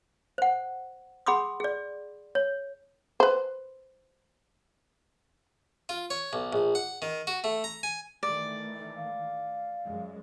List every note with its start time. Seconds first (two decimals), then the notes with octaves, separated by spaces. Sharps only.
0.38 C5 F#5
1.26 G#4 F#5 B5 C6 D6 D#6
1.60 G#4 D5
2.35 C#5
3.20 B4 C5
5.89 F4
6.10 C#5
6.33 B1
6.53 A#1
6.75 F#5
7.02 D#3
7.27 F#4
7.44 A3
7.64 A#5
7.83 G#5
8.23 D#3 E3 A3 D5
8.97 F5
9.83 F#2 G#3